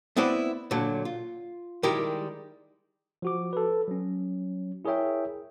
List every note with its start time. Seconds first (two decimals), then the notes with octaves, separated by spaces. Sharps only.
0.16 B3 C4 E4 B4 C5 D5
0.71 A#2 D3 F#3
1.05 F4
1.83 D#3 G3 G#3 E4 G4 A#4
3.22 F3 F#4 D6
3.53 A4 B4
3.88 F#3 C#4
4.85 E4 G#4 A#4 C#5 E5 G5